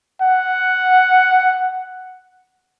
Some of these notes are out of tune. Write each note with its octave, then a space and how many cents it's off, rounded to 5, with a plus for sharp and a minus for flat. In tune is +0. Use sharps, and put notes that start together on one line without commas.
F#5 +0